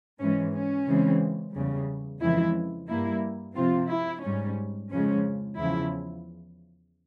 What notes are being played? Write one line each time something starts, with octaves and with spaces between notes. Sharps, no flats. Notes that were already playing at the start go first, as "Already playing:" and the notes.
G#2 E3 G#3 C#4
C#4
C#3 E3 G#3 C4
E2 C#3 G3
F2 C#3 E3 G#3 E4
G2 G3 A#3 E4
C3 F3 C4 F4
E4
G#2 G3 C#4
F2 C#3 F3 G#3 C#4
E2 C#3 F3 E4